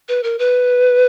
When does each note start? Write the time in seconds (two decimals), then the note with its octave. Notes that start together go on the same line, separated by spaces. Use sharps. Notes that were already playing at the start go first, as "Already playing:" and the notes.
0.09 B4
0.23 A#4
0.39 B4